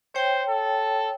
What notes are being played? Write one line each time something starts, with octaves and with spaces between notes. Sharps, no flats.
C5 C#5 G5
A4